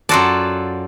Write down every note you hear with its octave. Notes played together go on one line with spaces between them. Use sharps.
F#2 F4 F#4 A4 D5 A5